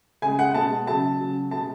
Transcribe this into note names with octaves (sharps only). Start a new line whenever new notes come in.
C#3 G#3 G#5
F#5
B2 G#3 A5
C#3 F#3 A5
C#3 F#3
B2 G#3 A5